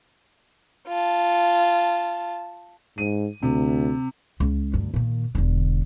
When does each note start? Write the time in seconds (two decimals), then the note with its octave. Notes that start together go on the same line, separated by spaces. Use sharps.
0.88 F4 A5
2.98 G#2 D#7
3.43 D2 C3
4.40 C#2
4.73 D2 G2
4.94 A#2 D#3
5.35 E1 D3